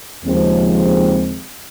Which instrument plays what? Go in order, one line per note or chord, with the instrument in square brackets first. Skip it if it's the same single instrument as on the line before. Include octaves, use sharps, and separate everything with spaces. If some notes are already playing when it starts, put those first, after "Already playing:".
[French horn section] D#2 C#3 F3 G#3 C4